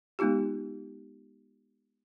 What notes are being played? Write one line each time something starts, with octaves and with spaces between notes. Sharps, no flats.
G#3 B3 D#4 F4 G4